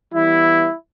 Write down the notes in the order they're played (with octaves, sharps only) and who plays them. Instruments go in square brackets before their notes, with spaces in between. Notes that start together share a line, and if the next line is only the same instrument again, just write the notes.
[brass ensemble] E3 G3 B3 E4